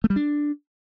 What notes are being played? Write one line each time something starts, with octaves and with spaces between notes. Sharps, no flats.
A3
G3
D4